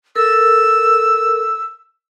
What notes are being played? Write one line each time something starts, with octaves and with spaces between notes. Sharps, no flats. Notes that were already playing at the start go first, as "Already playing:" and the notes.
A4 A#4 E6